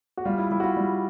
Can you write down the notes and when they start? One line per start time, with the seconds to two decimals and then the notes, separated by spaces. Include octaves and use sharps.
0.17 F#4
0.25 G3 F4
0.38 E4
0.51 G3 E4
0.60 F#4
0.64 F4
0.77 G3